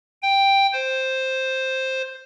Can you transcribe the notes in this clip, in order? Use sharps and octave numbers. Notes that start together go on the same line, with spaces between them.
G5
C5